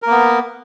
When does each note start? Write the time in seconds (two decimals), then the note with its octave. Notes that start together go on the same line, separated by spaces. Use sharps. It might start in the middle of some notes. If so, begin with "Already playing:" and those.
0.02 A#4
0.06 A#3
0.11 B3